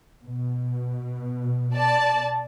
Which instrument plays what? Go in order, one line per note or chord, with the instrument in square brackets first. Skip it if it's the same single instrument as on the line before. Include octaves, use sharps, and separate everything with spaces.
[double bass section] B2
[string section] D5 A5